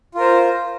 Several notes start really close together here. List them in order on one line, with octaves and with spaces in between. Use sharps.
F4 A#4 C5